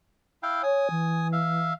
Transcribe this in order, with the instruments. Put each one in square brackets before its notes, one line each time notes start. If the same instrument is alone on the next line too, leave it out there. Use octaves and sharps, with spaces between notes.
[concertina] E4 F5 G5
[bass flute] C#5 [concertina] G#5 D#6
[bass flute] E3
[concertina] E5 F5